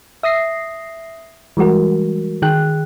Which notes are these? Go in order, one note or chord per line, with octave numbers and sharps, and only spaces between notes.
E5 D#6 A#6 C7
E3 G3 G#3 F#4 A#4
D#3 G#4 G5 F#6